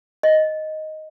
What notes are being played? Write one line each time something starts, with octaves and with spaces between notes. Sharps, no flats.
D#5